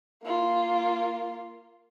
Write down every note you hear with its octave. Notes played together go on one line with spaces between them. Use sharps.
A#3 F4